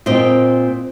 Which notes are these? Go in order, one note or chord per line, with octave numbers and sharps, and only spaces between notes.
A#2 C4 C5 D#5